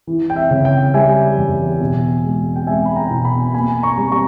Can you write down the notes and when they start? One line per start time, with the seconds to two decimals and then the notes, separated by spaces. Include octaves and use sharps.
0.07 E3
0.30 G5
0.36 E5
0.51 C#3
0.65 G5
0.94 G3 E5 G#5
1.37 E2
1.81 B2
2.24 G#3
2.56 G5
2.67 G#3 E5 G#5
2.85 B5
2.96 G5 A#5
3.11 B2
3.25 G#5 B5
3.54 A#3 G#5 B5
3.83 A#5 C#6
3.98 G3
4.12 A#5 C#6